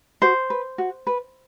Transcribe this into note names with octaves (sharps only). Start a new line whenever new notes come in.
F#4 C5
B4
F#4
B4